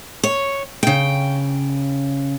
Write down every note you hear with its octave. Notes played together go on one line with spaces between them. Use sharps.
C#5
C#3 G5